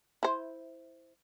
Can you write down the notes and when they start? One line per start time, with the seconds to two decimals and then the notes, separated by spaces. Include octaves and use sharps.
0.23 E4 C5